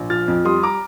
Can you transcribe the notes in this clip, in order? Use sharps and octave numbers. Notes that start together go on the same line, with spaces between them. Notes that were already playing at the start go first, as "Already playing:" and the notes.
Already playing: A#1
F3 F6 A6
F2
G3 C6 D#6
A#5 D6